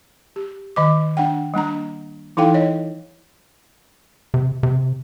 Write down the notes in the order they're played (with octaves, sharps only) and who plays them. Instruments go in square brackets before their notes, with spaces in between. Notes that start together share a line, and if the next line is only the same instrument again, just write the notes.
[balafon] G4
D#3 D#5 D6
D4 F#5 G5
G3 A#3 D4 A#5
E3 D#4 E4 A4 F5 G5
C#5 D#5
[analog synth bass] C3
C3